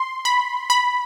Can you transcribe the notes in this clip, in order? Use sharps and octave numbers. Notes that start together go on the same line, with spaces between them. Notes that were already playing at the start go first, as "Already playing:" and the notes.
Already playing: C6
B5
B5